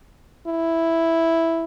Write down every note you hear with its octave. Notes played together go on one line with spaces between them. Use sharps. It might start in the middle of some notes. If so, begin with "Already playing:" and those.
E4